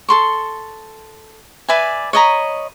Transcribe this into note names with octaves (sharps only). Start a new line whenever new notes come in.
A4 C6 C#6
B4 D5 E5 G#5
C#5 D#5 A#5 B5